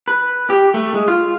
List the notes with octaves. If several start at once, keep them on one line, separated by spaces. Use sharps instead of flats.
B4
G4
A3
G#3
F4